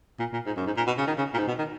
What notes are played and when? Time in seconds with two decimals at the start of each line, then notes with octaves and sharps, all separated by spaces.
0.20 A#2
0.33 A#2
0.46 G#2
0.57 F#2
0.66 G#2
0.77 A#2
0.87 B2
0.98 C#3
1.07 D#3
1.18 C#3
1.34 A#2
1.38 G#2
1.48 B2
1.58 D#3